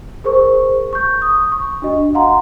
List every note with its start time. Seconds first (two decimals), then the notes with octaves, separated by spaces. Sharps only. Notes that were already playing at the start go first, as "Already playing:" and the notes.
0.24 G#4 A#4 C5 C#6
0.93 C#6 G6
1.22 D#6
1.52 C#6
1.82 D4 F#4 D#5
2.15 F5 F#5 A#5 C6